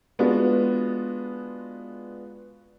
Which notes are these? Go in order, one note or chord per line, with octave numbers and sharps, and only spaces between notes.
G#3 B3 D4 F4 F#4